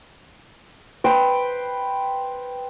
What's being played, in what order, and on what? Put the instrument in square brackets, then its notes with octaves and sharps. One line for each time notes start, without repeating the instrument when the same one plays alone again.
[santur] B4 C5 G5